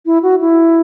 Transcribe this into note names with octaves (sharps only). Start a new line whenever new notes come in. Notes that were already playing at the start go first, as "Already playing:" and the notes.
E4
F#4
E4